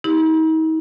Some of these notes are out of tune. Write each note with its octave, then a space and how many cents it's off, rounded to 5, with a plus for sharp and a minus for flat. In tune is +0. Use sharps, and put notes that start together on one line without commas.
D#4 +40 G4 +20